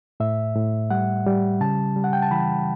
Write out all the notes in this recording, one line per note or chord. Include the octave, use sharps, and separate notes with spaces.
A2 E5
A2
G3 F#5
G3
C#3 A5
G3
F#5
G5
A5
E3 B5